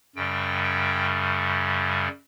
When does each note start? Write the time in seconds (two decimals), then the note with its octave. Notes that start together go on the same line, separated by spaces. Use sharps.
0.16 F#2 C#3 G3 G5
0.64 G5